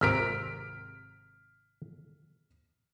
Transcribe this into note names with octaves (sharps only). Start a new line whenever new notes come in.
G#1 C3 A#4 F6 B6 D7